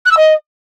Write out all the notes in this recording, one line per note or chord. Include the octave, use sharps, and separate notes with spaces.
F#6
E6
D#5